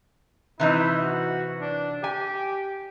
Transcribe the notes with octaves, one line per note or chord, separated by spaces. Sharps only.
C3 E3 D#4 E4
F#4
D4
G4 G#5